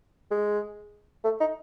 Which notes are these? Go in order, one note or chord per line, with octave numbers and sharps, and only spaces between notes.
G#3
A3
D#4